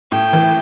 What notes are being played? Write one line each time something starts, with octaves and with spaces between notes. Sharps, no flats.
A2 G5
E3